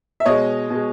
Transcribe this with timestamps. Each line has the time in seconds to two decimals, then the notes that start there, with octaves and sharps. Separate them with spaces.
0.20 E5
0.25 B2 G#3 C#5 D#5
0.70 B2 G#3